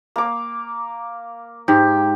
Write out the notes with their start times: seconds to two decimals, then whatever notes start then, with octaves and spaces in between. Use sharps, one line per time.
0.16 A#3 D6
1.68 G#2 G4